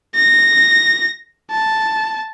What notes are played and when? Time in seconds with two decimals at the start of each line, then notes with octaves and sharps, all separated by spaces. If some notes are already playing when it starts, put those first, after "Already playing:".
0.16 A#6
1.51 A5